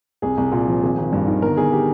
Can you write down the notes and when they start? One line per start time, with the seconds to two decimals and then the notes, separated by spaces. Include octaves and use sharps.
0.22 C2 G#4
0.37 C2
0.52 A#2
0.67 F3
0.82 G#1 G#4
0.97 G#1
1.12 G2
1.27 D#3
1.42 G1 A#4
1.57 G1 G#4
1.72 G4